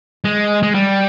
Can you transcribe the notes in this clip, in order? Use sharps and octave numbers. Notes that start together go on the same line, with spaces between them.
G#3
G#3
G3